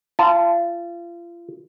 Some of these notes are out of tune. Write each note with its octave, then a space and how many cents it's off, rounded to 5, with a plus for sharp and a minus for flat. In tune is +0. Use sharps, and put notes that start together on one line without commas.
F4 -35 A5 +0